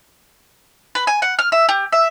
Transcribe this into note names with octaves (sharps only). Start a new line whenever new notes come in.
B4
G#5
F#5
F6
E5
G4
E5